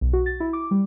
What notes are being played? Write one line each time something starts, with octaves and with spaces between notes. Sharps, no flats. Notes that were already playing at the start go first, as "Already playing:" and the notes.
B1
F#4
A6
E4
D6
G3